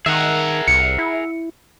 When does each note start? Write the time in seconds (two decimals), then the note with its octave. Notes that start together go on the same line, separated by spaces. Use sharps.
0.06 D#3 G#4 A#4 E5 F#5
0.68 C2 C#7
0.99 E4